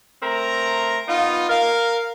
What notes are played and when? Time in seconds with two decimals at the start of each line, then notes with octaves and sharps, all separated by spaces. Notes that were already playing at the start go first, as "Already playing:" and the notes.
0.22 A3 C4 A#4 A#5
1.07 B3 D#4 F4
1.50 A#4 F5